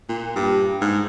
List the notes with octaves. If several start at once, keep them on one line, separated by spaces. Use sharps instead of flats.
A#2
G2
G#2